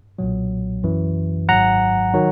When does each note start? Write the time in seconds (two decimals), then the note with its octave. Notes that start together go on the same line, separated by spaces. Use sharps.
0.19 B1 A#2 F#3
0.83 F#2 E3
1.49 G#1 G#2 F#3 F#5 A#5
2.14 D#3 F#3